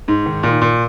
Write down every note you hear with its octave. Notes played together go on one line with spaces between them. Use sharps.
G#2
D#3
A#2
A#2